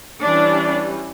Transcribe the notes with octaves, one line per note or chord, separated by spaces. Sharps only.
E3 G3 C#4 D4